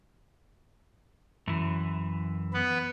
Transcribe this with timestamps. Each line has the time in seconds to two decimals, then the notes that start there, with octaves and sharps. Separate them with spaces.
1.47 F#2 E3
2.54 B3 B4